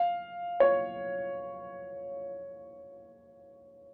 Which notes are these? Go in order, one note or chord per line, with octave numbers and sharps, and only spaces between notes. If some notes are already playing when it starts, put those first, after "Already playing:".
Already playing: F5
C#5